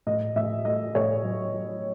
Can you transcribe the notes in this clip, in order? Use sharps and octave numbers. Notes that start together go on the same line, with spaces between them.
A2 D#5
A2 E5
A3 D#5
A2 C#5
F#3
F#3